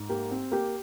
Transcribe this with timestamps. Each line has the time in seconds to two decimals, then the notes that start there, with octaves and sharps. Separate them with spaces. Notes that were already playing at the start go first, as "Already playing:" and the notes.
Already playing: G#2
0.09 A#3 G4
0.31 C4
0.51 A#3 G4